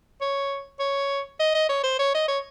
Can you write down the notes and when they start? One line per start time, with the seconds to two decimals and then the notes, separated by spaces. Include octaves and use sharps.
0.21 C#5
0.79 C#5
1.40 D#5
1.55 D#5
1.69 C#5
1.84 C5
1.99 C#5
2.15 D#5
2.28 C#5